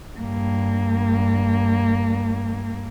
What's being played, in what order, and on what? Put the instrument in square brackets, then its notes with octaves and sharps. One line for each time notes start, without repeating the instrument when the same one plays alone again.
[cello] G2 A#3